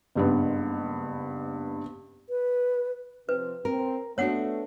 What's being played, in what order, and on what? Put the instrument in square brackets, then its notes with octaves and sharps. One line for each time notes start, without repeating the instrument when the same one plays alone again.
[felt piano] F#1 G2 B3
[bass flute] B4
[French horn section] C3 F3 C4 [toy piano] B4
[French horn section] C4 [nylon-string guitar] A#4
[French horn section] A3 [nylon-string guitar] B3 D4 F#4 [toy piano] C#5 F#5